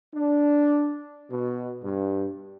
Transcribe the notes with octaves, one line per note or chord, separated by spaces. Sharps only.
D4
B2
G2